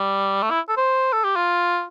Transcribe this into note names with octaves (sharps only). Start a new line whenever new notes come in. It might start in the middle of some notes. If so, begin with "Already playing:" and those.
Already playing: G3
A3
E4
A4
C5
A4
G4
F4